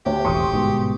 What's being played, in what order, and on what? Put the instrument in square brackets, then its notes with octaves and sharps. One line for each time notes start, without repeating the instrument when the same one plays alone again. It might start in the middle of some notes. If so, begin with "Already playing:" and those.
[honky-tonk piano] D2 C#5 [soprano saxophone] G4
[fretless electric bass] E1 A1 A2 [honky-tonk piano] C6 C#6 D#6
[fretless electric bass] G1 G#2 B2